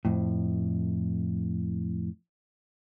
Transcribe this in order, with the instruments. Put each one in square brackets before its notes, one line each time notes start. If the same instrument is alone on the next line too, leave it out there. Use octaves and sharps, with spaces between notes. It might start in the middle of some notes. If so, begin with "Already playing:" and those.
[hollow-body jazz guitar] F2 A2